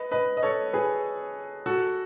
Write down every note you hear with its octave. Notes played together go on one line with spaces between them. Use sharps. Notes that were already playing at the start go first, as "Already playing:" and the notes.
Already playing: B4 D#5
B4 D#5
D#5
A4 C#5
G#4 B4
F#4 A4